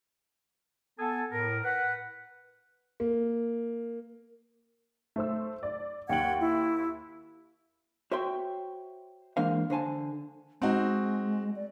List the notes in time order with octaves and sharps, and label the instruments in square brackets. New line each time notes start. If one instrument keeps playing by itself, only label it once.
[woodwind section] B3 A4 G#5 A5
A2 A#4
B4 F#5
[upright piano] A#3
[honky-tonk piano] A3 C5 E6
D5
[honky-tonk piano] D#2 F#7 [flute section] F#5 G5 G#6
[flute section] E4
[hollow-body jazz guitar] F#4 C5 C#5 E5 G5 C6
E3 G#3 A#3 D4 C5 F5
D3 C5 G#5 A5
[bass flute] G#3 [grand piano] C4 D#4 F#4
[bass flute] D5